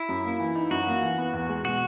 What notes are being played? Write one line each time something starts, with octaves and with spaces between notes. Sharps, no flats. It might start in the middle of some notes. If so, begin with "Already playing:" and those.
Already playing: E4
F#2
A#3
E3
D#4
F#2 F#4
A#3
E3
B3
E2
G#3
B2 F#4